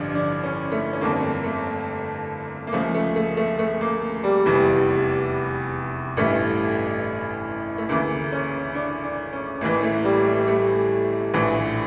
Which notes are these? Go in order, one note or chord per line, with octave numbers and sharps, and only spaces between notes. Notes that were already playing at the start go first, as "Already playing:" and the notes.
Already playing: A1 G2 D3 F3 D4
D4
C#4
A3
C#4
G1 F2 D3 A#3
A3
A#3
C#2 C#3 F3 A3
A3
A3
A3
A3
A#3
G3
F1 E2 E3
A1 G2 E3 A3
A3
D2 C#3 E3 A#3
C#4
D4
D4
C#4
A1 A2 E3 A#3
A3
G3
G3
A3
A#1 A2 E3